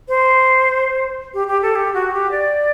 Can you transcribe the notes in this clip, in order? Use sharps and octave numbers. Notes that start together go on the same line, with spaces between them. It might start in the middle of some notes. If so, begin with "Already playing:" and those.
C5
G4
G4
A4
G4
F#4
G4
D5